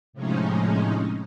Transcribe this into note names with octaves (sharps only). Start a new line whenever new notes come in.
A2 C3 F3 G#3 C#4 D#4